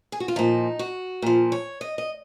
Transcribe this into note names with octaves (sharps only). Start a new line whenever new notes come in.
G#4
F#4
F4
A#2 F3 D#4
F#4
A#2 F3
C#5
D#5
D#5